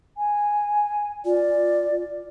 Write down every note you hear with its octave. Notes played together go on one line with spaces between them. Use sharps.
G#5
F4 D5